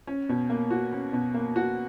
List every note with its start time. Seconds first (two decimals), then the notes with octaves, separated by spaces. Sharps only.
0.07 C#4
0.29 B2
0.50 A#3
0.71 F#4
0.92 C#4
1.13 B2
1.34 A#3
1.56 F#4